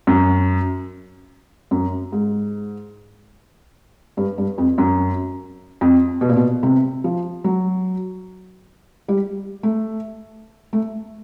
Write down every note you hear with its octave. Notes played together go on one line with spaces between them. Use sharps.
F#2
F#2
G#2
G2
G2
F2
F#2
F2
B2
A#2
B2
C3
F3
F#3
G3
A3
A3